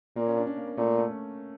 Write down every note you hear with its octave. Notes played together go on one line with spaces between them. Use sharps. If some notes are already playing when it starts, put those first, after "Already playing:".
A#2 A#3
C#4
D4
D4
A#3
A#3
A#2 A3
A#3
A3
C#4